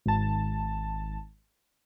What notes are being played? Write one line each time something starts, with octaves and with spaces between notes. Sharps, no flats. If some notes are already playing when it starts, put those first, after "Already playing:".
G#1 A5